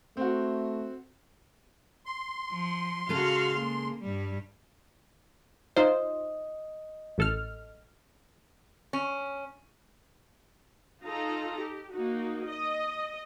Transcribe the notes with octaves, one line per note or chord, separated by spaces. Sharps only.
A3 C4 F#4
C6
F3
C#3 G#3 F#4 A4 F5
A#3
G2 G3
D#4 F4 C5 D#5
A1 A4 F6
C#4
D#4 F4 A4 A#5
G4
A#3 D#4 F#4
D#5